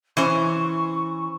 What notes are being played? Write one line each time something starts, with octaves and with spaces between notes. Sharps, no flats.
E3 C#4 C5 C#6